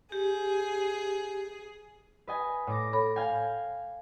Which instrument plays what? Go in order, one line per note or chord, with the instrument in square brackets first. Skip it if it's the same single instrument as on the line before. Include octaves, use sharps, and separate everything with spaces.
[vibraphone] G4 [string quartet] G#4
[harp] B4 D#5 G#5
A2 D6 A#6
[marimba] A4 C#5 B5
[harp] F5 G5 G#5